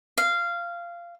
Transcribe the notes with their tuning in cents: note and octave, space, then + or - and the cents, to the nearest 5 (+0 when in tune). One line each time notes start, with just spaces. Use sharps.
F5 -15